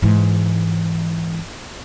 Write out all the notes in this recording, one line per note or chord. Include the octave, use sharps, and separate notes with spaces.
G#2 E3